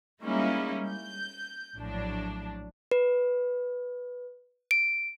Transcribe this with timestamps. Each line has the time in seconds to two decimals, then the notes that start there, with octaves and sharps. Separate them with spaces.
0.23 G3 G#3 A#3 C#4 D#4 E4
0.89 G6
1.76 A#1 A2 F#3 D4
2.91 B4
4.71 D7